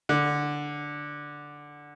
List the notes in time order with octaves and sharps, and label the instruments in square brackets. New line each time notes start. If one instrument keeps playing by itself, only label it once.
[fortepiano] D3